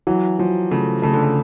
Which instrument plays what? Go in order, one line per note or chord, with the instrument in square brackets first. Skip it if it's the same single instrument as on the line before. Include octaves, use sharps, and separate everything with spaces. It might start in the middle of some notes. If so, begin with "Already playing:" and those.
[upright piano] E3 [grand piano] F#3
[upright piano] F3 [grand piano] F#3
[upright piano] C#3 [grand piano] A3
[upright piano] C#3 [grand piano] A3
[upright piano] D3
C#3